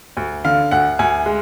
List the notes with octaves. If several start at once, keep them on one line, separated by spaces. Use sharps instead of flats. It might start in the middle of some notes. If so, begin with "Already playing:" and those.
D2
D3 F5
D2 F#5
D2 G#5
G#3